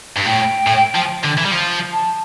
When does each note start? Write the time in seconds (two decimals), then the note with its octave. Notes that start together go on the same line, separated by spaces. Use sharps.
0.17 G2
0.26 A2 G5
0.68 A2
0.95 F3
1.24 D3
1.37 E3
1.45 G3
1.51 F3
1.92 A5